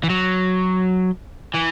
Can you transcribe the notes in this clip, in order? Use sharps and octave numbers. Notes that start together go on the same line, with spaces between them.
E3
F#3
E3